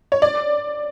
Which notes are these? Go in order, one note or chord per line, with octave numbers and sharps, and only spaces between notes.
C#5
D5